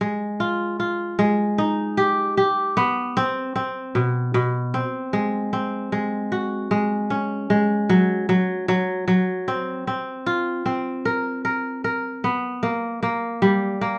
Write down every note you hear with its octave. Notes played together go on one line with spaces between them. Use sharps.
G#3
F4
F4
G#3
D#4
G4
G4
B3
C4
C4
B2
B2
C4
G#3
C4
G#3
F#4
G#3
C#4
G#3
F#3
F#3
F#3
F#3
C4
C4
F4
C4
A#4
A#4
A#4
B3
A#3
A#3
G3
A#3